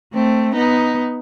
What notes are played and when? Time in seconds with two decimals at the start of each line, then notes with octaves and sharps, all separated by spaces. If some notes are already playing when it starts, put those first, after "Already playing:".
0.13 A3 C4
0.54 B3 D#4